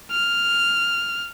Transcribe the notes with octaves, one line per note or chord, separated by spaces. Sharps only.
F6